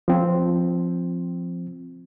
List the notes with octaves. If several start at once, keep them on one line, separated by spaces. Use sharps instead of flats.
F3 C4